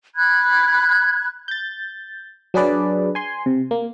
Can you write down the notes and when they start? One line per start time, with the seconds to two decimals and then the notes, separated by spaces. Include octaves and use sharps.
0.15 B5 F#6 G#6
1.48 G6 A6
2.54 F#3 D4 G#4 B4 D5
3.15 G#5 C6
3.46 C3
3.71 A#3